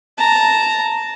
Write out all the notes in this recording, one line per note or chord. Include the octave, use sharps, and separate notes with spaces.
A5 A#5